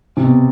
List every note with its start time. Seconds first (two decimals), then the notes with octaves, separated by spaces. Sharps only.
0.17 C3
0.23 B2